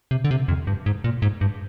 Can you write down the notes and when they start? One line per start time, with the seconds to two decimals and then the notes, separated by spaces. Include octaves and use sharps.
0.11 C3
0.25 D3
0.31 C3
0.48 F2
0.67 G2
0.86 G#2
1.04 A#2
1.22 G#2
1.41 G2